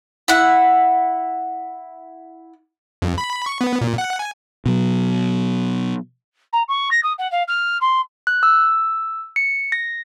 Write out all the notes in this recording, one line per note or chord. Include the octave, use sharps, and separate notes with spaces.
E4 F#5
F2
B5
C#6
B3
A#2
F#5
G#5
B2 F#3
A#5
C#6
A#6
D#6
F#5
F5
F6
C6
F#6
E6
C#7
A#6